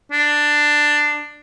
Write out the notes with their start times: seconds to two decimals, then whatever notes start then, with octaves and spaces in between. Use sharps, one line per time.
0.12 D4